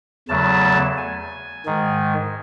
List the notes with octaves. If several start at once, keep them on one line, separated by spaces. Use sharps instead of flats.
E2 C#3 F#3 A3 A5
G#5
G#2 D#3 G#3